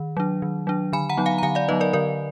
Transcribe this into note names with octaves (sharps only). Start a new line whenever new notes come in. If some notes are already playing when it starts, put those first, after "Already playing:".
Already playing: D#3
F#3 D4
D#3
F#3 D4
D3 G#5 B5
F#5 A#5
F#3 B3 D#4
F5 G#5
A#5
D3 F5 G#5
D5 F5
F#3 B3 D#4 B4 D#5
A#4 D5
D3 A#4 D5